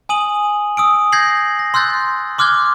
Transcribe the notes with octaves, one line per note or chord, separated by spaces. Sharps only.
G#5 D#6 D#7 F#7
D#6 E6 D7
G6 G#6 A#6 C7 F#7
A#6
C6 E6 F#6 G6 A6
C6 D6 F6 F#6 G#6 G7